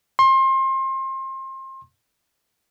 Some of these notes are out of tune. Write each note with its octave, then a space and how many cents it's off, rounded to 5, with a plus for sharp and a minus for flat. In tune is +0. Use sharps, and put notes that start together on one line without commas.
C6 +30